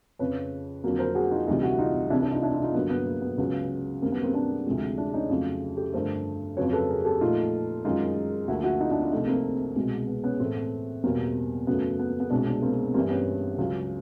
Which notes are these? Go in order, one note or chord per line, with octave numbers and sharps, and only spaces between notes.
F2 C#3 F3 B4 C#5
F2 D3 F#3 A#3
A#4 C5
F#4 G#4
D#4 F4
D2 C3 E3 G3 D#4 F4
E4 F#4
D#4 F4
C2 C3 E3 D4 E4
D4 E4
D#4 F4
D4 E4
D#4 F4
D#4 F4
G2 D3 F#3 A#3 B3
B3
A#3
B3
C#2 C#3 F#3 B3
F#2 D#3 G3 A#3 C4
B3
A#3 C4
C4 D4
D2 C3 F3 G#3
D4 E4
C#4 D#4
F2 C#3 F#3 A3
G4 A4
G2 D3 F3 A3 A#4 C5
F2 C#3 F#3 B4 C#5
A4 B4
G#4 A#4
G4 A4
A#2 F3 A3 D#4 F4
F#2 D#3 G#3 D#4 F4
D2 D3 F3 A#3 E4 F#4
E4 F#4
D#4 F4
D4 E4
D#4 F4
C2 C3 F3 A3 D#4 F4
A#3 C4
C2 B2 G#3
B3
B3 C#4
A2 E3 A3 A#3 C4
E2 B2 G3 A#3 C4
F#2 C#3 F#3 A3 B3
B3
A#3
B3
C2 B2 G#3 C4 D4
C4 D4
A#3 C4
G2 E3 G3 A#3 C4
B3 C#4
C#2 C#3 F#3